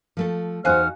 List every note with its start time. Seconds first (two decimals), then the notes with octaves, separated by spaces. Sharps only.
0.17 F3 A3 A4
0.65 E2 D#4 F#4 C5 F5 G#5 F6 F#6